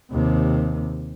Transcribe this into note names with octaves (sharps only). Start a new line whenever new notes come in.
D#2 C3